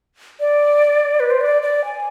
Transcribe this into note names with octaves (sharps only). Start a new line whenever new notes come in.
D5
B4
C5
D5
D5
G#5